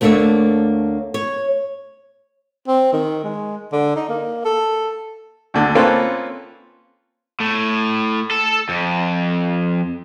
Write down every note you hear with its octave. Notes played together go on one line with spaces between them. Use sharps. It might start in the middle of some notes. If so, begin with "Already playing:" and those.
D2 A3 A#3 D4 C#5 E5
C#5
C4
D#3
G#3
D3
D#4
A#3
A4
D2 D3
A#3 C4 C#4 F4 A4 B4
A2
A4
F2